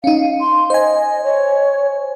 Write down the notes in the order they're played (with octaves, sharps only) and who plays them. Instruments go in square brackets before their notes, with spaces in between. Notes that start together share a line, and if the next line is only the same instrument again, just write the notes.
[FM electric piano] C#4 D#4 [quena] F5
[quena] C6
[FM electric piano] C5 G#5 [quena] D#5
[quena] C#5